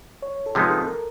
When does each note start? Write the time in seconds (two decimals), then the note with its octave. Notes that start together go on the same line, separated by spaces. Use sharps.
0.22 C#5
0.46 A4
0.55 C3 F3 G#3 B3 D#4 G#4
0.71 A4
0.82 A4
0.88 A#4